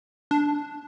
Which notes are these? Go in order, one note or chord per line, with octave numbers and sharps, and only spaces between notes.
D4